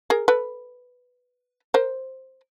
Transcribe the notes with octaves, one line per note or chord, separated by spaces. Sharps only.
G#4 A#4
A4 B4
A#4 C5